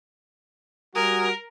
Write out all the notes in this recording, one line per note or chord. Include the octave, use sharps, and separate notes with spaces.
G3 F#4 A#4 G#5 D#6